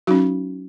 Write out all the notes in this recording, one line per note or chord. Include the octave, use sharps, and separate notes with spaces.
F#3 C#4 D#4 F#4